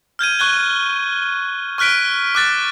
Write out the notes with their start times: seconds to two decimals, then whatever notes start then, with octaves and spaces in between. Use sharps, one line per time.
0.19 F6 G6 G#6 D#7
0.39 C#6 F#6 G#6 G7
1.78 C#6 F6 F#6 B6 D7
2.35 D6 F#6 A6